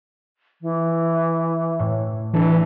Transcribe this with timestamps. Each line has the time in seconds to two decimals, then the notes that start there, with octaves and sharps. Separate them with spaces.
0.62 E3
1.79 A2
2.34 E3 D4 A4